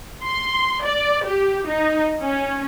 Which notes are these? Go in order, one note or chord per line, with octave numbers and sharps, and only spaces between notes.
C6
D5
G4
D#4
C#4